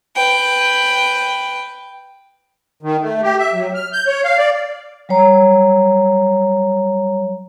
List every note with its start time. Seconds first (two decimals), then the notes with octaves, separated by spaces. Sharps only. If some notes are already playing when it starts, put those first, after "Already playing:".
0.16 B4 G5
2.83 D#3
3.01 A3
3.22 G4
3.39 E5
3.53 F#3
3.75 F6
3.93 G6
4.07 C#5
4.24 F5
4.38 D5
5.09 F#3 G3 C#5 A#5